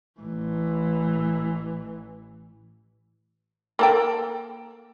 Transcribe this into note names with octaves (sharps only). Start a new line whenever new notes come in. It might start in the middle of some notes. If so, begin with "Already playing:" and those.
A1 E3
A#3 A4 G5